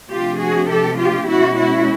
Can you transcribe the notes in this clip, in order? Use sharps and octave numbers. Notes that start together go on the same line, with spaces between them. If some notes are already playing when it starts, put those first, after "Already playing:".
C3 F3 A3 D4 F4 G4
F#4 G#4
G4 A4
F4 G4
B2 G#3 C#4 E4 F#4
E4 F#4